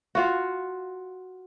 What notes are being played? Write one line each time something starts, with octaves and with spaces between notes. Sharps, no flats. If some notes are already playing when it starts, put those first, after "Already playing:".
F4 F#4